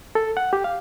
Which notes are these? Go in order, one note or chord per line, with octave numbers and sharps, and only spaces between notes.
A4
F#5
G4
F5